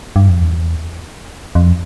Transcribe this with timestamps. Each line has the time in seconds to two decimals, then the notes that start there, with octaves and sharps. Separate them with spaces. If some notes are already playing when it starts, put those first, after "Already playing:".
0.16 G2
0.29 F2
0.41 E2
1.55 F2